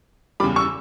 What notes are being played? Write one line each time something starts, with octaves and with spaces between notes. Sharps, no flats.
E2 C#3 G3 B5 D6
C#6 E6